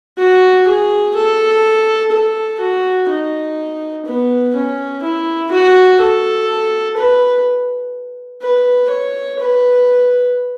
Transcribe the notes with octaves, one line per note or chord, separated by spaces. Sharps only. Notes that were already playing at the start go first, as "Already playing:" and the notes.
F#4
G#4
A4
A4
F#4
D#4
B3
C#4
E4
F#4
A4
B4
B4
C#5
B4